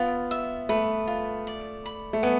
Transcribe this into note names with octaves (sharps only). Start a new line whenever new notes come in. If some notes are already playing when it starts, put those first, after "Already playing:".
Already playing: B3 F4
E5
A3 B4
F4
D5
B5
A3
B3 G#5